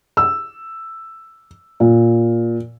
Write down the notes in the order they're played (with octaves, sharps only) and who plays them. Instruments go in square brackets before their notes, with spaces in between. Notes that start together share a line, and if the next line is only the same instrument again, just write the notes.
[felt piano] E6
A#2